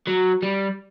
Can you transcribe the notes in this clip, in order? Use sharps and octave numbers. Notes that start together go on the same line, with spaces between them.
F#3
G3